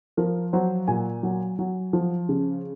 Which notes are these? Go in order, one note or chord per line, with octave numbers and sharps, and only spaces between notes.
F3 A#4
F#3 C5
A#2 G#5
F#3
F#3
F3
C#3